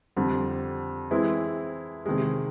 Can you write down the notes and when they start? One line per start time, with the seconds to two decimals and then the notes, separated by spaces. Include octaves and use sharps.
0.16 F2 D3 G3
1.11 E3 G#3 C4 E4
2.06 C3 D#3 G#3